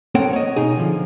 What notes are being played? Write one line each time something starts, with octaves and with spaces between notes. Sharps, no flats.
A#3 C4 A4 C#5 F#5 G5
C#5 D#5
B2 D#4 G#4
D3 F3